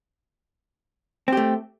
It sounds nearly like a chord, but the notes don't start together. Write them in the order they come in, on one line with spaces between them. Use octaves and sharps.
C4 G4 A3